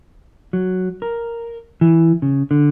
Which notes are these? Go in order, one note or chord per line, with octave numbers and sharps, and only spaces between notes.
F#3
A#4
E3
C#3
D3